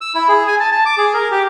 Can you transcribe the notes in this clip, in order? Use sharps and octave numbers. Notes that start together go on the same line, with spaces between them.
E6
E4
G#4
G#5
A5
A5
D6
G#4
A#4
G4